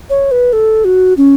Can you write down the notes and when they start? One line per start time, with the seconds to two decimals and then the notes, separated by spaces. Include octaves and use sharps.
0.10 C#5
0.31 B4
0.53 A4
0.85 F#4
1.17 C#4